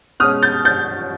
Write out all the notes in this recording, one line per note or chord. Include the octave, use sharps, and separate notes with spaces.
B2 G#3 C#4 D#6 F6
G6 A6
G6 A6